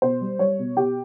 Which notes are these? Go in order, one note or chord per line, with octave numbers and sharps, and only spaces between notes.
B2 C5
G3
G3 C#5
B2
B2 G4